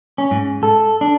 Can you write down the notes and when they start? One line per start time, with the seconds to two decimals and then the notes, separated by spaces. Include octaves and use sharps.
0.18 C#4
0.31 G#2
0.63 A4
1.01 D4